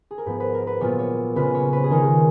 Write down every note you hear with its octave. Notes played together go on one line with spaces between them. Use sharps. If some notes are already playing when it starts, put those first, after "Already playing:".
G#4
A#4
G#2 F3 B3 B4
B4
A#4
B4
A#2 F#3 B3 F4 C#5
C#5
C#3 G#3 C#4 F4 B4
C#5
B4
G#4
D#3 G#3 D#4 A#4
G#4